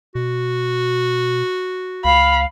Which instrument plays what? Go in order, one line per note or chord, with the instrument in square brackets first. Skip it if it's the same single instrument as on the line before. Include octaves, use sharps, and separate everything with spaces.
[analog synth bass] B2 [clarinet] F#4
[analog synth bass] C#2 [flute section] F5 [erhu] B5